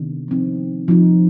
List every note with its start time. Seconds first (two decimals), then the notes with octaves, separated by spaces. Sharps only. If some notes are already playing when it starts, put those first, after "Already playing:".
Already playing: C3 D#3 B3 D4
0.28 F3 C4 D#4
0.88 F3 C4 D#4